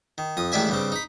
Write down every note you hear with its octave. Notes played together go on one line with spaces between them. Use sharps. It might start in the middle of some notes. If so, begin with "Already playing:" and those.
D#3
F2 D#6
A1 D#3 G#3 D5 E5 G#5
G2 C#3 C4
D#4 B5